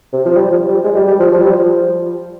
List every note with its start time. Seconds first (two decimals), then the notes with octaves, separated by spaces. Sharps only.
0.13 C3
0.26 F3
0.36 G3
0.52 F3
0.68 G3
0.84 G#3
0.96 G3
1.07 G3
1.20 F3
1.32 F3
1.42 G3
1.51 F3